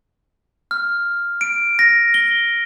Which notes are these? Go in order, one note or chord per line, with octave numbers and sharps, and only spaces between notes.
F6
D7
A#6
G7